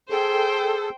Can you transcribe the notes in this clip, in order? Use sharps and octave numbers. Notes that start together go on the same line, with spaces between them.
G#4 A4 C5 G5